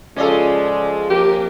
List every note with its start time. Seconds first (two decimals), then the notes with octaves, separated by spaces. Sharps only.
0.16 C#3 F3 G#3 C#4 F4 A4 D5 D#5
1.10 F2 F3 A#3 G4 A#4